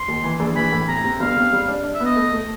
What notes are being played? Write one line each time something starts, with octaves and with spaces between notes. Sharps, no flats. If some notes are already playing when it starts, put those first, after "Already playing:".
Already playing: C6
D#2
E3
A#1
E3 B5
A2
C3 A#5
C3
G1 F5
C3
G3
D4
D4
E5
B3 D#5
A3
A3